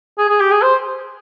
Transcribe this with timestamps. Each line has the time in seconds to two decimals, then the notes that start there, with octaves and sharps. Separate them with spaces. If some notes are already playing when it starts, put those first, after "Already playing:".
0.18 G#4
0.28 G#4
0.40 G4
0.51 G#4
0.62 C5